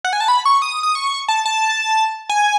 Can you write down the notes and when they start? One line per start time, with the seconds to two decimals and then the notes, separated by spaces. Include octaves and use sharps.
0.04 F#5
0.13 G#5
0.21 A5
0.28 B5
0.45 C#6
0.62 D#6
0.83 D#6
0.95 C#6
1.28 A5
1.46 A5
2.29 G#5